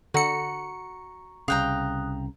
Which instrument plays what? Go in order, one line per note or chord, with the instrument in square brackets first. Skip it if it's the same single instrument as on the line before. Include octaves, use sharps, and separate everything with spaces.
[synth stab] D3 C#7 [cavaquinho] F#4 [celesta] A#5 C#6
[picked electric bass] C2 C#3 [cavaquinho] F5 G5 A#5 [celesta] D#6 F#6